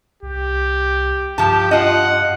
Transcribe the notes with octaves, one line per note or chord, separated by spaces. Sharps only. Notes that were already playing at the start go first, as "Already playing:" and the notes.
C2 G4
G2 F3 G4 A5
F4 D#5 F#5